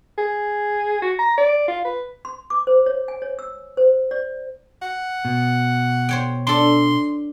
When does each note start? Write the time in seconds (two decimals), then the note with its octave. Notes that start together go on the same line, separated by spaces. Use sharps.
0.18 G#4
1.02 F#4
1.19 A#5
1.38 D5
1.68 F4
1.85 B4
2.25 C6
2.50 D6
2.67 C5
2.86 C#5
3.08 G#5
3.22 C#5
3.39 E6
3.77 C5
4.11 D5
4.82 F#5
5.25 B2
6.09 C5 C#5 G5
6.47 D4 A4 C6